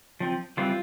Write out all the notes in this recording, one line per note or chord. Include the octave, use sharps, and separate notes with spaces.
F3 C4
E3 G3 C4 F4